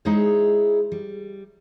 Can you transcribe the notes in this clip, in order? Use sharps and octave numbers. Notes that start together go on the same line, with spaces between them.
G#3 D#4 E4 G#4 C5 C#5
G3